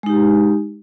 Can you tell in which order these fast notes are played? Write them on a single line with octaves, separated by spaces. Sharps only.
G#3 D#4 G4